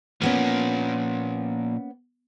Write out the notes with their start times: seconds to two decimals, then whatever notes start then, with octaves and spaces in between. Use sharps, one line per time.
0.21 A#2 F3 A#3 B3 C#4